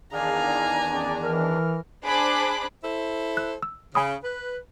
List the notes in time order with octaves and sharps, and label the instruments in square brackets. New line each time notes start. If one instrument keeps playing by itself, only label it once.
[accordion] E2 D#3 D4 [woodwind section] G#4 D5 F5 [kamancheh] G#5 A#5
[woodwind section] C#4 G#4 D5
[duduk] E3 [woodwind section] A#4 F6
[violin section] D4 G#4 C5 B5 D6 F#6
[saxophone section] E4 A4 C5
[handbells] F#6
E6
[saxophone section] C#3 [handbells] G#5 B5 D#6
[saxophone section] B4